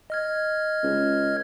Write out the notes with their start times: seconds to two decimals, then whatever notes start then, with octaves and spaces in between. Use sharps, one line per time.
0.10 D#5 F6 G#6
0.83 C#2